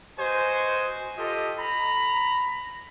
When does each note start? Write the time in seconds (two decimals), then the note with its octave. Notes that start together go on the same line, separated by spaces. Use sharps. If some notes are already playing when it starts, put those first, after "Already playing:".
0.19 F#4 B4 C5 D#5 G#5
1.17 F4 G4 A4 D#5
1.59 A#5 B5